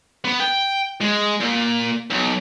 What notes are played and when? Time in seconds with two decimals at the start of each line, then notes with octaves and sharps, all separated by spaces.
0.25 B3
0.41 G5
1.01 G#3
1.40 A#2
2.10 B1